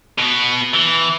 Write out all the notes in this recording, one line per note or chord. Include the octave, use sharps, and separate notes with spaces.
B2 B3
E3